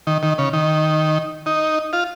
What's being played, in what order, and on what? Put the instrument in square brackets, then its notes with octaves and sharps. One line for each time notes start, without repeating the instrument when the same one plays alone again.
[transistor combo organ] D#3
D#3
C#3
D#3
D#4
F4